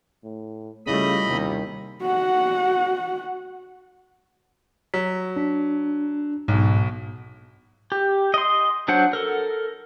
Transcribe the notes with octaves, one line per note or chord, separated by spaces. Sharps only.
A2
C#3 G3 A3 C#4 E4 F4 D#5 B5
D#2 C3 G3
F#4 F#5
F#3 B6
D4
B1 G#2 B2
G4
D#5 C6
F#3 D4 C5 F#5
A4 A#4